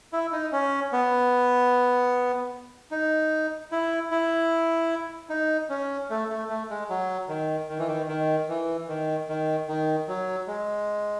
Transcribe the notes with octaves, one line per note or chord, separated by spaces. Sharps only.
E4
D#4
C#4
B3
D#4
E4
E4
D#4
C#4
A3
A3
A3
G#3
F#3
D#3
D#3
E3
D#3
D#3
E3
D#3
D#3
D#3
F#3
G#3